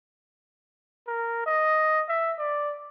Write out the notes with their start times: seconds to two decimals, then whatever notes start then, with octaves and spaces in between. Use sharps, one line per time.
1.08 A#4
1.46 D#5
2.09 E5
2.39 D5